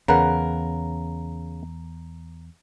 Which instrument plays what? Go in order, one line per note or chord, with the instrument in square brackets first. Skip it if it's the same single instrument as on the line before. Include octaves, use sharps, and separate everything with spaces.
[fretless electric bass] E2 [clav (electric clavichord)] C#3 B4 F#5 [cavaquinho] A#4